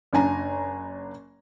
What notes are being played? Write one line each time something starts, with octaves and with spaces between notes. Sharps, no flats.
F#1 D4 G#5 A#5